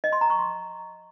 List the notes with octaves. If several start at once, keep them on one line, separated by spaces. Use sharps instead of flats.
D#5
C6
A#5
C#6
C6